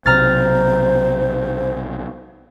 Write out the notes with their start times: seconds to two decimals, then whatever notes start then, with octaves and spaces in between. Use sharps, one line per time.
0.06 B1 C3 F#3 C5 A#5 F6 A6